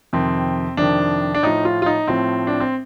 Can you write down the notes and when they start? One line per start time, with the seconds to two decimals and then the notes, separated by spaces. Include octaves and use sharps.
0.13 F2 C3 D#3 C4
0.77 F2 C3 D#3 D4
1.34 D4
1.43 A2 F3 D#4
1.65 F4
1.82 F4
1.86 D#4
2.07 A2 F3 C4
2.47 D4
2.60 C4